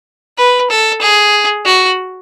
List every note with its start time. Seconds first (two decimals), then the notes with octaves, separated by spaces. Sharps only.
0.38 B4
0.70 A4
1.01 G#4
1.65 F#4